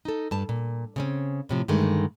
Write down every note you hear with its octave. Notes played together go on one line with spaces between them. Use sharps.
D#4 A4
G2 A5
A#2
C#3 C4 C#4
A2 C3 F3
G2 D3 D#3 G#3 A3